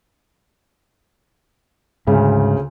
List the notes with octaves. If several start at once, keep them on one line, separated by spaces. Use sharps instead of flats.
D2 G#2 C#3